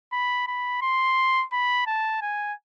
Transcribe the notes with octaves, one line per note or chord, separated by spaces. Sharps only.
B5
B5
C6
B5
A5
G#5